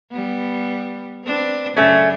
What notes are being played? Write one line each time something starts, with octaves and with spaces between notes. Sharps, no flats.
G3 B3
C4 D4 B4
F#2 C#3 A3 C#4 D4